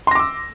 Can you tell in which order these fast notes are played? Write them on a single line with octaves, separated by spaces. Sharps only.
C6 A#6 D6 E6